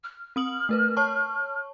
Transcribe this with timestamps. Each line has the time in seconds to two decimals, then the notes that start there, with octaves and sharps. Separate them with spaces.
0.03 F6
0.36 C4 D#6 F#7
0.69 A3 A#4 B4
0.97 C#5 A5 C#6